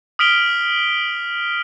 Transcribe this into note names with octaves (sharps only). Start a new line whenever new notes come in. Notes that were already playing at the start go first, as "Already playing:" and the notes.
D#6 F6 B6 D7 F7 G7